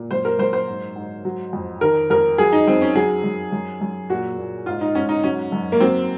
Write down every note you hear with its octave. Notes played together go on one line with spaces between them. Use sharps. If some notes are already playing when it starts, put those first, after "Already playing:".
Already playing: A#2
F#2 C5
A#4
F#2 C5
C5
G#2
G#2
F#3
F2
D#3 A#4
F2 A#4
F#3 G#4
D#4
F#2 C4
C#4
F#3 G#4
F#2
F#2
F#2
A#2 F#4
A#2
G#2 F4
D#4
G#2 C#4
D#4
F#3 C#4
F#2
A#3
F#3 C4